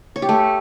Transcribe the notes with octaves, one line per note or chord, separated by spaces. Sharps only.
C#5
G4
A3